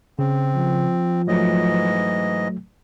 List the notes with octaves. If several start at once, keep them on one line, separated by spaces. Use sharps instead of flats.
C#3 C4
F3
G#2 E3 F#3 A3 D#5